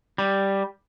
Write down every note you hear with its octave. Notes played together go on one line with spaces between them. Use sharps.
G3